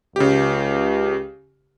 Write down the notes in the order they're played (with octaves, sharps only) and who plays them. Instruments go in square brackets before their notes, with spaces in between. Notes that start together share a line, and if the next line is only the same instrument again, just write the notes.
[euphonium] C#2 [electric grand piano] C#3 G4